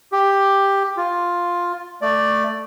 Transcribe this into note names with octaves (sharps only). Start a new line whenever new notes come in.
G4
F4
A3 D5